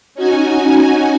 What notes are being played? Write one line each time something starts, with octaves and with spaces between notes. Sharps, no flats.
C#4 D#4 F#4 G#5